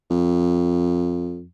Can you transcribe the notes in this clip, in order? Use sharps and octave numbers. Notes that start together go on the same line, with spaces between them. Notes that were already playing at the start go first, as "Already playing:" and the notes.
F2